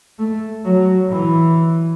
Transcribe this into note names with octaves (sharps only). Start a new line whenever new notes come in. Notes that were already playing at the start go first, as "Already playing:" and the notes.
A3
F#3
E3